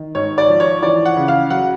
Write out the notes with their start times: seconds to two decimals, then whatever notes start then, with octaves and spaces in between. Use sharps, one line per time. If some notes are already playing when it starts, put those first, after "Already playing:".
Already playing: D#3
0.15 G#2 C#5
0.38 D5
0.49 F3
0.60 C#5
0.83 E3 D5
1.05 F#5
1.16 C#3
1.28 F5
1.50 F#3 F#5